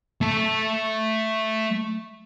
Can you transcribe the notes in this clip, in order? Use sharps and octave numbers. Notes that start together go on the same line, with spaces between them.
A3 A5